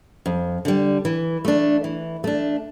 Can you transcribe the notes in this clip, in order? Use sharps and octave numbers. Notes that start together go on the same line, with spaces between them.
F2
D3 G3
E3
A3 D4
E3
A3 D4